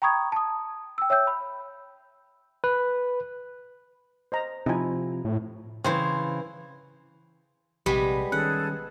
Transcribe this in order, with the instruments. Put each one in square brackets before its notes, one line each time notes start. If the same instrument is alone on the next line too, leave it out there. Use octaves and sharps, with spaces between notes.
[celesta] G5 A#5 B5 C#6 D#6 G#6
A5 D#6
G5 E6
C#5 E5 G5 E6 G6
B5
[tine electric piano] B4
[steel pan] C5 D#5 A#5
[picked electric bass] C3 F3 [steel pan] D#4 E4 G#5
[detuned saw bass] A2
[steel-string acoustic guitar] C#3 E3 [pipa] C4 C5
[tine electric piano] A#1 C3 [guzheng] G3 G#3 B3 [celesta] G4
[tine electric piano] D#3 G3 C#4 [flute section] G#4 A4 [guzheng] F#5 [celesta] F#6